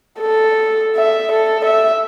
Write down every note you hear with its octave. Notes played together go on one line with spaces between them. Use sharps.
A4
E5
A4
E5